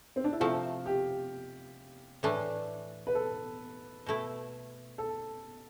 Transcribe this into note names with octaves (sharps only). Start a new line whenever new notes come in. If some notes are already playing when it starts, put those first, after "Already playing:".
C4
D4
E4
C3 F3 A3 F4
G4
A2 E3 A3 D4
B4
A4
B2 A3 E4
A4